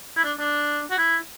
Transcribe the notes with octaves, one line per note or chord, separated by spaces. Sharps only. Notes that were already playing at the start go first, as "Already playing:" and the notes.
E4
D4
D4
F#4
E4